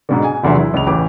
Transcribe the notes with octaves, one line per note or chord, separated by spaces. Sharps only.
G#2 B2 D3
G#5
F1 E2 D3 F#3 E5 C6
E4
C#2 C#3 F7
A1 E3 D6